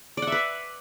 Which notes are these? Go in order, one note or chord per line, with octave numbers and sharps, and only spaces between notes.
B4 D5 E5 F#5